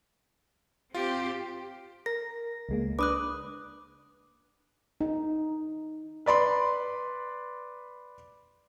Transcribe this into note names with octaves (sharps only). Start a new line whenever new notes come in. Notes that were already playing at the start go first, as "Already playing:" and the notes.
C4 F4 G4
A#4 A#6
C#2 G#3 A#3
D4 B4 D6 D#6 F#6
D#4
B4 D5 B5 C6